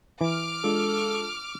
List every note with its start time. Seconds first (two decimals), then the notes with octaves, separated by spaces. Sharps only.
0.21 E3 D6 F6
0.64 G#3 D4 F4 A4